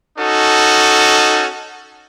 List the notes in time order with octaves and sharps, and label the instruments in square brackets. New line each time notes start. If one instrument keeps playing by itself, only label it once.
[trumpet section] C#4 D#4 F#4 A4